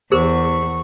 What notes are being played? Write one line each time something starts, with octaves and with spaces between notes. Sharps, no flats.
E2 G#4 A#4 C5 C#6